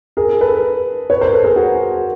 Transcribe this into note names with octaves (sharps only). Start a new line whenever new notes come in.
G#4 A#4
A4 B4
B4 C#5
A#4 C5
A4 B4
G#4 A#4
F#4 G#4